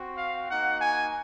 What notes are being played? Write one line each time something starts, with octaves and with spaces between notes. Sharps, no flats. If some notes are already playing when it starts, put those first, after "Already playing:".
Already playing: C4 F#4
F5
A#3 D#4 F#4 F#5
G#5